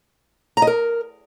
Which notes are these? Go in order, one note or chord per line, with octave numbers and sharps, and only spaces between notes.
A#5
D#5
A#4